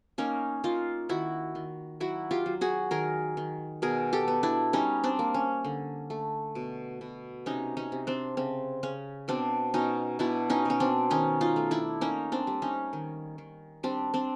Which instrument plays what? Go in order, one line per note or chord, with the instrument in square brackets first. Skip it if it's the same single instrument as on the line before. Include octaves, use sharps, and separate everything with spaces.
[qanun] A#3 C#4 D#4
A#3 D#4 F4
D#3 E4 F#4
D#3
F#3 E4 F#4
F4 G4
F#3
F#4 G#4
D#3 G#4 A#4
D#3
B2 G#4 A#4
G4 A4
B3
D4 E4
G3 C#4 D#4
C4 D4
A#3
C#4
D3
A3
B2
B2
C3 C#4 D#4
C#4 D#4
C3
C4 D4
C#3 C4
C#3 C#4
B2 C4 D4
B2 C#4 D#4
B2 D4 E4
C#4 D#4
B2 C#4
C4 D4
D#3 C#4 D#4
D#4 F4
A3
D4 E4
A#3 C#4 D#4
C4 D4
G3
C#4 D#4
D#3
D#3
G3 C4 D4
C4 D4